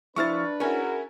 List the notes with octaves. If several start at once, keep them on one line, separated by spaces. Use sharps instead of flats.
F3 D4 E4 B4 C5 C#6 F6 A6
C#4 E4 F#4 G#4 A#4 C#5 G#5